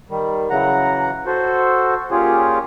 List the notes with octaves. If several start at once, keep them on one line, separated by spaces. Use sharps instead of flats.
D#3 G3
C#3 E3 F#3 F#5 A#5
F#4 A4 C5
A#2 C#4 F4 G4 G#4 C#5